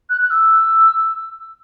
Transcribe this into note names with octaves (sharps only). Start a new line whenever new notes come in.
F#6
F#6
E6